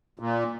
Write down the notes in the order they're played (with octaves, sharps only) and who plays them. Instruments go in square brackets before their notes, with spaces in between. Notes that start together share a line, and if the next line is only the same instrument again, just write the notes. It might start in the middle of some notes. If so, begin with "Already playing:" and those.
[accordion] A#2